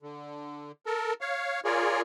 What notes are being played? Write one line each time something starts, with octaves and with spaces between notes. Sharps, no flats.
D3
A4 A#4
C#5 F5
F4 G#4 A#4 C#5 D5